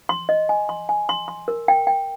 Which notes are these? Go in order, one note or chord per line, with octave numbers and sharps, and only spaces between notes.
C6
D#5
G#5
C6
G#5
C6
C6
A#4
G5
G5